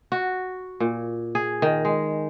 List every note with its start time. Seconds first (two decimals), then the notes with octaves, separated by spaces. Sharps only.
0.12 F#4
0.80 A#2
1.35 G#4
1.62 D#3
1.85 G#3